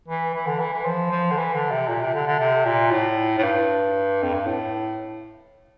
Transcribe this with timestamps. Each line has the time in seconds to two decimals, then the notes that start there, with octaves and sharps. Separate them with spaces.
0.08 E3
0.34 E3
0.46 D3
0.60 E3
0.73 E3
0.85 F3
1.11 F3
1.31 D3
1.37 E3
1.54 D3
1.71 C3
1.88 A#2
2.02 C3
2.14 D3
2.27 D3
2.40 C3
2.65 A#2
2.91 A2
3.38 A2
3.43 G2
4.23 F2
4.34 G2
4.46 A2